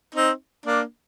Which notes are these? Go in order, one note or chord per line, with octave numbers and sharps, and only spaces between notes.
C4 D#4
A#3 D4